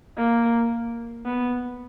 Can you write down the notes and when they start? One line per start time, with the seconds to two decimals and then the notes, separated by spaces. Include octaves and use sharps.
0.18 A#3
1.25 B3